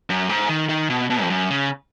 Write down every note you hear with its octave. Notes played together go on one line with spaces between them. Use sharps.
F#2
G#2
D#3
D#3
B2
B2
F2
F#2
C#3